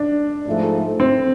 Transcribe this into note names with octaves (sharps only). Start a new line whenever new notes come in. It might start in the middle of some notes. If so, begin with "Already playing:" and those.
Already playing: D4
G#2 F3 A3
C4